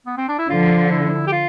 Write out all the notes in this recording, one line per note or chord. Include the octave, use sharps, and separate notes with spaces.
B3
C4
D4
E4
D3 F3 F4
E4
G4
F4